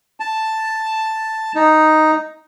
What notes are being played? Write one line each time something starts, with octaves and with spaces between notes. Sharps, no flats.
A5
D#4